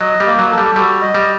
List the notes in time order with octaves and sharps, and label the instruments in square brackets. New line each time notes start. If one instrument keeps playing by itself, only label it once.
[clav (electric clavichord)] F#3 [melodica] D#5
[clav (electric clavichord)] G3
[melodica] A#3
[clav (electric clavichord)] F#3
[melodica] A4
[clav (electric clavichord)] G3
[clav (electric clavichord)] G3 [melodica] F#4
[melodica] D#5
[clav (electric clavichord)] G3